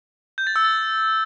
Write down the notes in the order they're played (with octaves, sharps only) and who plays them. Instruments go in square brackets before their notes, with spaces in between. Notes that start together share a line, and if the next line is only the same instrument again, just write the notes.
[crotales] G6
A6
E6
A6